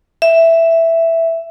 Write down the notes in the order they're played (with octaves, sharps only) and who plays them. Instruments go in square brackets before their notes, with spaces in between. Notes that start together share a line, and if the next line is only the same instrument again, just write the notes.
[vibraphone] E5